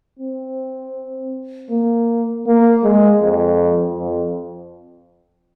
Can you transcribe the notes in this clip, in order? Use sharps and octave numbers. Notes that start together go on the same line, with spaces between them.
C4
A#3
A#3
G#3
F2
F2